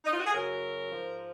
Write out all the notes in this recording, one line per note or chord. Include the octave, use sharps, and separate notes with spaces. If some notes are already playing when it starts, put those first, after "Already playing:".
D#4
F4
F#4
G#4
F#2 C#3 F#3 A#4
G#2 F3